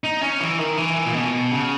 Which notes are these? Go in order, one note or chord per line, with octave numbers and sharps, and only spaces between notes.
D#4
C#4
E3
D#3
E3
A#2
B2
C#3